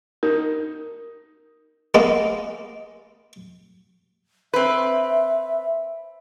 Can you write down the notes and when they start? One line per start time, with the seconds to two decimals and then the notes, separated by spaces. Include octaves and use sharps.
0.23 D#4 A#4
1.94 G#3 A#3 B3 D#5
4.54 C4 B4 E5